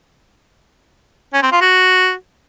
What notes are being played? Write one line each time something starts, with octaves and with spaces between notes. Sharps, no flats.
C#4
C4
F4
F#4